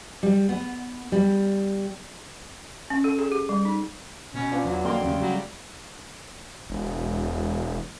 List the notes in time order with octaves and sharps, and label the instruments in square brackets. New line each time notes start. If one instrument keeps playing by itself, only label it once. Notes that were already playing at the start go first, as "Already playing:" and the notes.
[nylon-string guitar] G3
B3
G3
[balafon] C#4
A4
G#4
G4
G3
D#4
[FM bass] B2 [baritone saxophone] C#4
[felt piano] B3 C4 F4 [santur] D4
[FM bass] E2 [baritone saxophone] F#3
[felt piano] F2 [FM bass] A#3 [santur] D5 G5 C6
[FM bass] D#2 [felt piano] C#3 A3
[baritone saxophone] F#3 [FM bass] G3
[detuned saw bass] E1